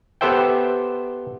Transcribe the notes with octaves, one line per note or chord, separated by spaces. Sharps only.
B3 G4 A4 C5 E5 G5